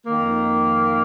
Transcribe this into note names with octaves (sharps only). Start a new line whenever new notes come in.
F2 D#3 A#3